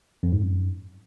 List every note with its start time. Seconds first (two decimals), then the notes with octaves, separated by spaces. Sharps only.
0.23 F2
0.33 G#2
0.42 F#2